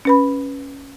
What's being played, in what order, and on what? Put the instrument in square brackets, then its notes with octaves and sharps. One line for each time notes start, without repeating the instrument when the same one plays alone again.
[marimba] C#4 B4 B5